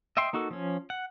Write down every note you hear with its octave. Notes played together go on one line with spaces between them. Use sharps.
D#5 E5 G5 C6
A#3 D#4 F#4 A4
F3 C#4
F#5